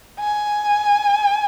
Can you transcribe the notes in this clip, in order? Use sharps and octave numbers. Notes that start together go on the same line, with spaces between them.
G#5